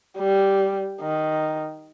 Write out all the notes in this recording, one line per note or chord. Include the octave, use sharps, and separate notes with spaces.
G3
D#3